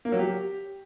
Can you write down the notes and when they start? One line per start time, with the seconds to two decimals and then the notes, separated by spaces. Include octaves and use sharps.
0.05 A#3
0.12 F#3
0.19 G4